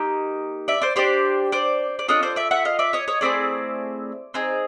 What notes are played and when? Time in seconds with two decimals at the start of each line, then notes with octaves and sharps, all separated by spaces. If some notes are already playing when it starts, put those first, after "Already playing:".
Already playing: A#3 D#4 G4
0.68 D5 E5
0.82 C5 D5
0.96 D4 G4 C5 D5
1.52 C5 D5
1.99 D5
2.08 D4 F4 A4 C#5 D#5
2.23 C5 D5
2.36 D5 E5
2.51 E5 F#5
2.65 D#5 F5
2.79 D5 E5
2.93 C#5 D#5
3.08 C#5 D#5
3.21 A3 C4 E4 G#4 C5 D5
4.34 C4 D#4 G#4